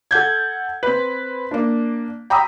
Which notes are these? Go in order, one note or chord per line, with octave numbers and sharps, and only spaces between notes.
A4 F#5 G6 G#6
C4 B4
A#3 D4
G5 A#5 B5 D#6 E6